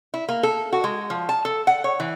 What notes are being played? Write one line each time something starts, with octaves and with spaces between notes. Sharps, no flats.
E4
A#3
A4
F#4
G#3
F3
A5
A4
F#5
C#5
E3